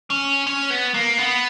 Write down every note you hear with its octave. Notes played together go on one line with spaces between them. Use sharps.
C#4
C#4
B3
A#3
B3